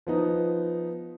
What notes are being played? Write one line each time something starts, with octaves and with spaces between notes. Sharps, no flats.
F3 B3 D#4